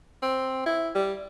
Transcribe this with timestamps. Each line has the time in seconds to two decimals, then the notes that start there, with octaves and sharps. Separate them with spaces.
0.22 C4
0.66 E4
0.95 G3